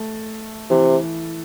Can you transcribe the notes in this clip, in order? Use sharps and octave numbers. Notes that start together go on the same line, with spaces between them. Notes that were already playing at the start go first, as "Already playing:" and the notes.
Already playing: A3
C3 E3